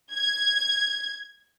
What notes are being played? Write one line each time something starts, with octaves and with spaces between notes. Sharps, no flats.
G#6